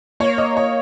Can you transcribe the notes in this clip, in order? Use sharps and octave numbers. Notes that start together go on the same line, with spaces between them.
A#3 C#5
D#5
C#5